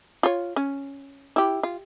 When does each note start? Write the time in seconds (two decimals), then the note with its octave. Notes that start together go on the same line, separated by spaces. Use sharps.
0.23 F4 C#5
0.56 C#4
1.36 E4 G4
1.63 F4